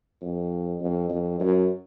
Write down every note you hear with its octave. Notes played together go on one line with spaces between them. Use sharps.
F2
F2
F2
F#2